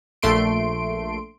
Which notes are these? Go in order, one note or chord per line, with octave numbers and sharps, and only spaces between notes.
A#1 A3 C6 D7